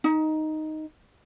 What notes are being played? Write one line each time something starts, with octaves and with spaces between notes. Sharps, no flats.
D#4